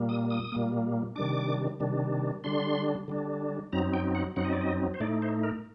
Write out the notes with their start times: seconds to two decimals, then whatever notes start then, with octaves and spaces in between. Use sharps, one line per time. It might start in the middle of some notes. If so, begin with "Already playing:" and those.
Already playing: A#2 G3 A#3
0.09 D#6
0.30 D#6
0.52 A#2 G3 A#3
1.16 C3 D#3 G3 D4 D6
1.80 C3 D#3 G3 D4
2.44 D3 G3 D4 C6
3.08 D3 G3 D4
3.72 F#2 F#3 C4 D#4 A#5
3.94 G5
4.15 F#5
4.36 F#2 F#3 C4 D#4 F#5
4.45 D#5
4.53 D5
4.61 D#5
4.94 C5
5.00 A2 A3 D#4 D5
5.22 C5
5.43 A#4